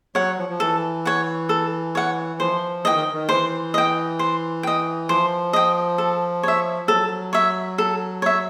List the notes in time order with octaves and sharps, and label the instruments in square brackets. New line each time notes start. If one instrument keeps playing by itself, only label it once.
[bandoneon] F#3 [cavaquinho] C#5 F#5
[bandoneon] F3
F3
[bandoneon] E3 [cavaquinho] A4
[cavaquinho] C#5 F#5
A4
C#5 F#5
[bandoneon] F3 [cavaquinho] C5
[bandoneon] E3 [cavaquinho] D#5 G5
[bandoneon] D#3
D#3
[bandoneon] E3 [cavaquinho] C5
[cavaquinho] D#5 G5
C5
D#5 G5
[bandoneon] F3 [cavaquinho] C5
[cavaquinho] D#5 G5
A4
C#5 E5
[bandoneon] F#3 [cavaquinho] A4
[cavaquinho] C#5 E5
A4
C#5 E5